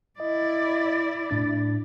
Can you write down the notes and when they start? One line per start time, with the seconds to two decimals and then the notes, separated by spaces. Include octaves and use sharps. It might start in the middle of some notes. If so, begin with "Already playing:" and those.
0.20 E4 D5 D#5
1.30 A2 D4 A6